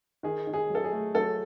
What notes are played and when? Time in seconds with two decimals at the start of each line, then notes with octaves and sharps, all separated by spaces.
0.23 D#3 G#4
0.47 D#3
0.54 G#4
0.70 F#3 A4
0.84 G#4
0.92 A3
1.15 F#3 A4